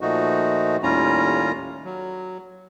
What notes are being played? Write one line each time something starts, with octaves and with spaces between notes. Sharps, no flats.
A#2 F3 A3 D#4 F#4
D#2 A2 G3 C#4 F4 A#5
F#3